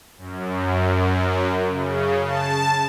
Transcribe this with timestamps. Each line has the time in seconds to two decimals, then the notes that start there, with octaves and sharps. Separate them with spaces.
0.18 F#2
1.69 C#3
2.25 A5